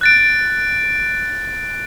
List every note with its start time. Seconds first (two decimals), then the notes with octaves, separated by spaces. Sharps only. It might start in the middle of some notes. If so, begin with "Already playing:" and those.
0.01 F#6 A6 D7